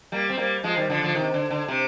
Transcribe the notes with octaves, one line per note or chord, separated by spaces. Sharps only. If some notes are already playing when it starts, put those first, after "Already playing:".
G3 A#3
C4
G3 A#3
F3 G#3
D#3 G3
D3 F3
D3 F3
C3 D#3
D3
D3
C3